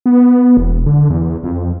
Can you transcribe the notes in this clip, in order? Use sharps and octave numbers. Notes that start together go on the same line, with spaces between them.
B3
E1
D3
E2
F2